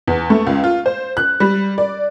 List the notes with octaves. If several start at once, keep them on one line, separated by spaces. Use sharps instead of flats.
E2
A3
C#2
F4
C5
F#6
G3
D5